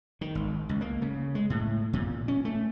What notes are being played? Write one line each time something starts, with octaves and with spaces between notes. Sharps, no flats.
D#3
G#1
C#2
A#3
C#3
G#3
A2
A#2
C#4
A3